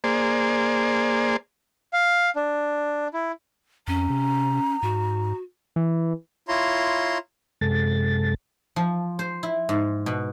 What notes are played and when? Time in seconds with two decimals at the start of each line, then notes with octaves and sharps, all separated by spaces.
0.04 A#3 G#4 C5 D5
1.93 F5
2.36 D4
3.14 E4
3.88 F2 C#4 A#5
4.10 C3
4.83 G#2 F#4
5.76 E3
6.48 E4 F4 C#5 A#5 C6
7.61 F#2 C3 G#3 A4 A6
8.76 F3
9.19 C5
9.43 E4
9.69 G#2
10.06 B2